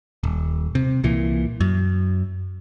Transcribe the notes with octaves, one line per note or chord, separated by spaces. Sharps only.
D#1
C3
C2 A#2 E3
F#2